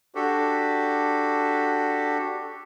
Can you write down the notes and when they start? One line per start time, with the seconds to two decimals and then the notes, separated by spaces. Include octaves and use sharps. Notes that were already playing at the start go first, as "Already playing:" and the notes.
0.15 D4 F#4 G4 A4